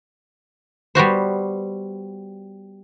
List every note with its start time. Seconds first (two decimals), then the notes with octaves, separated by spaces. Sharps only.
0.95 G3 B3 F#4 C5